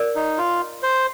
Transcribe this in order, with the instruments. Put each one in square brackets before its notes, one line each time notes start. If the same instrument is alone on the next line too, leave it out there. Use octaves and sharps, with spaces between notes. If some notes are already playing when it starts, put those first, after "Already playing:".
Already playing: [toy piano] A#4 D5
[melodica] D#4
F4
C5